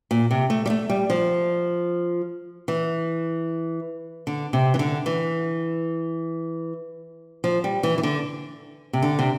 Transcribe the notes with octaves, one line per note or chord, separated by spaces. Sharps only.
A#2
C3
A3
G3
A3
G3
F3
E3
D3
C3
E3
D3
E3
F3
G3
E3
E3
D3
C3
D3
C3